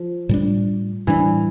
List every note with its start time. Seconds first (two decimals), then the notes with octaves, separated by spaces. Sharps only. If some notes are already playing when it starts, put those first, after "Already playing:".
Already playing: F3
0.29 A2 G3 D4
1.07 A2 E3 G3 D4